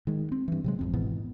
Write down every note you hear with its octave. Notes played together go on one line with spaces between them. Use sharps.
D#3 G#3
C4
G2 E3
C3 F#3 G#3
G#1 F2 C4
G#1 G#2 B2 E3